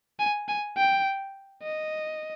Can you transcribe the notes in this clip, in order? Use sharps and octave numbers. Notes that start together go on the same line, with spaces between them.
G#5
G#5
G5
D#5